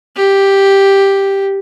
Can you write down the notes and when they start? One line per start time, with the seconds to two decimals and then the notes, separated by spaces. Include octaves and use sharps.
0.16 G4